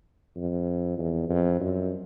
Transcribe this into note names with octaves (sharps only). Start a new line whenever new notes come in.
F2
E2
F2
F#2